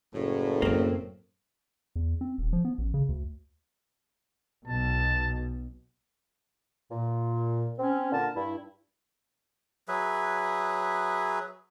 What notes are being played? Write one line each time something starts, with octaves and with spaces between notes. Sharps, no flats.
F#1 A2
F#2 A#3 C4
E2
C4
D#1
F3
B3
A1
C#3
D2
B1 B2 A5
A#2
C4 C#4
A#2 D3 A#4 A5
G2 E4
F#3 G#4 B4 E5